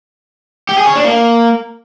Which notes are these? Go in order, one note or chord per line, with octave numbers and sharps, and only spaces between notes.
G4
G#4
C#5
D4
A#3